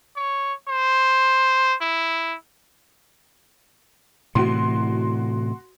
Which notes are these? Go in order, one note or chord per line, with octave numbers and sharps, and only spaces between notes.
C#5
C5
E4
A2 C3 E3 F#4 C6